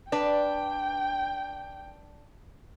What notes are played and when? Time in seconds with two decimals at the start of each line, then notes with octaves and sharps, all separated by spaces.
0.12 D4 B4 G5